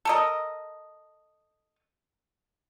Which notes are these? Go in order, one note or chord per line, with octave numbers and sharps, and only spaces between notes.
A4 A#4 D#5